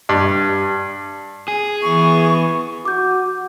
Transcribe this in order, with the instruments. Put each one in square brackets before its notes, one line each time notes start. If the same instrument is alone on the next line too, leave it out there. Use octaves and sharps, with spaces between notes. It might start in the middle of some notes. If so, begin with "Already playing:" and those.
[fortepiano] G2
[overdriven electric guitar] G#4
[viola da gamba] E3 B3 [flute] C#6
[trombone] F#4 [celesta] D6 G6